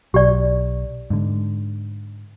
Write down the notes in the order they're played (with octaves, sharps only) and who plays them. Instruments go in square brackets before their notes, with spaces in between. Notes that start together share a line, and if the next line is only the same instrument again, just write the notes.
[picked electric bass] B1 [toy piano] G4 D5
[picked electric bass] G#2 D3